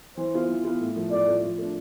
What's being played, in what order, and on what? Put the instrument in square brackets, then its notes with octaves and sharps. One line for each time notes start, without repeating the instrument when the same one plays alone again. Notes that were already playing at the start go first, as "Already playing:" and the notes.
[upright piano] E3 [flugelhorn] C5
[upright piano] B3 F4
E3
B3 F4
A2
F3 A3
[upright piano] A2 [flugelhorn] D5
[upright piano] F3 A3
F3
A3 D4